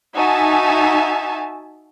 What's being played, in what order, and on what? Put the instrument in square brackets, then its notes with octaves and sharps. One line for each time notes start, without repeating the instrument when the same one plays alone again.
[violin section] D#4 F#4 E5 G#5 A5